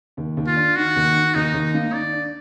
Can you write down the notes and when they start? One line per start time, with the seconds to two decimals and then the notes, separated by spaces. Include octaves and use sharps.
0.17 D#2
0.37 D#2
0.47 F4
0.56 D4
0.76 D#3 F#4
0.96 D#2
1.15 D#3
1.35 D#2 D#4
1.54 D#2
1.74 A#3
1.93 D#3 D5
2.13 D4